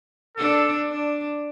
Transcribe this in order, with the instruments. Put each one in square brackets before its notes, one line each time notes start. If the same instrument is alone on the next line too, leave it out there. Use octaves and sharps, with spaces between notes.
[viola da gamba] D4 [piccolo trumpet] A4
[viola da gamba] D4